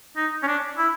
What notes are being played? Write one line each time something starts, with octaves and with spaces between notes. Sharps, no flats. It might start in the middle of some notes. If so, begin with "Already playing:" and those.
D#4
C#4
D4
E4